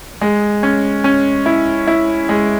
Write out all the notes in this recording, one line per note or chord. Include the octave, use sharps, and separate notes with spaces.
G#3
C#4
C#4
E4
E4
G#3